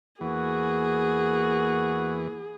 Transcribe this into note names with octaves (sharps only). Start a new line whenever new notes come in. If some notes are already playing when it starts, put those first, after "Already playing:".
E2 E3 A#3 F#4 G#4